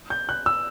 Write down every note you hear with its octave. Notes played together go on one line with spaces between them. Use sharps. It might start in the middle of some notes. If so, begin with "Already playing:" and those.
G6
F#6
E6